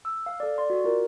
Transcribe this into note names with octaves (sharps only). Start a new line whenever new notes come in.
E6
F5
A4 D5
D5 C6
F#4
F4 A#4